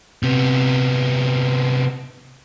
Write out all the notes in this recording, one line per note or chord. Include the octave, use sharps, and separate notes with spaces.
C3 B3